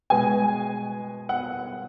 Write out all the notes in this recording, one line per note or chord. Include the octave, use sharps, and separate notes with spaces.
B2 G#3 B3 G#5
F#5